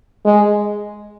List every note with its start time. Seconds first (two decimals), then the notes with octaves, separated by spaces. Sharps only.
0.25 G#3